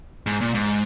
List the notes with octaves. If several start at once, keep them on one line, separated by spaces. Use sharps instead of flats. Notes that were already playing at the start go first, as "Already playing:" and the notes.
G#2
A#2
G#2